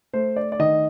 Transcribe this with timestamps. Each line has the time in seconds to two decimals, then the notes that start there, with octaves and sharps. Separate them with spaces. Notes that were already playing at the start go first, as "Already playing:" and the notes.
0.13 A3 C5
0.36 D5
0.52 D5
0.59 D#3 D#5